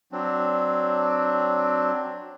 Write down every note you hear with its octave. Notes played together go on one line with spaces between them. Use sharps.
F#3 C4 D4